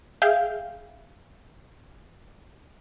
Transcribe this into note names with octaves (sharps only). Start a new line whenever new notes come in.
G#4 E5 F5 G5 G6